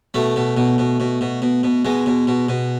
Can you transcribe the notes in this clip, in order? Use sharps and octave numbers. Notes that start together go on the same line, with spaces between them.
B2 A3
B2
B2
B2
B2
B2
B2
B2
B2 G#3
B2
B2
B2